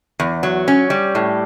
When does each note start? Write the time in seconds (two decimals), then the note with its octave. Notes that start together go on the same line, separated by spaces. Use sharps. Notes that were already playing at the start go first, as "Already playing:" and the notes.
0.20 E2
0.43 F#3
0.68 C#4
0.90 G3
1.15 A2